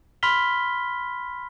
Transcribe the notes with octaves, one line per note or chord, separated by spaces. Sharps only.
B5 C6 F6 B6 G7